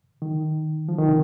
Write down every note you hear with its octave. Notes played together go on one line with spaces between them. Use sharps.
D#3
F3
D#3
C3